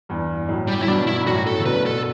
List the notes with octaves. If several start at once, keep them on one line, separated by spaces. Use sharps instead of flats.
E2 G2
F#2 A2
G3
A2 E4
G2 B2 D4
E4
G2
F#2 A2 F#4
A4
C#3
G2 B2 B4
A4